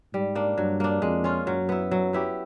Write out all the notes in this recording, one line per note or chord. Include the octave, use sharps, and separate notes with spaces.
G#2 G3
A#3 D4
G2 F#3
A#3 D4
F2 G#3
C#4 F4
F#2 F#3
B3 E4
F#3
B3 E4 G4